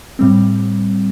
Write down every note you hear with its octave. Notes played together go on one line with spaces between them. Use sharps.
A2 G3 C4